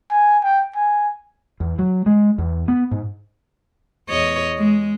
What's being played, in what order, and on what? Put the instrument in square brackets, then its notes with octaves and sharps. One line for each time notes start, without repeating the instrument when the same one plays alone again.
[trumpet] G#5
G5
G#5
[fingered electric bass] E2
F#3
G#3
E2
B3
G#2
[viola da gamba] E2 C#5 D#5
G#3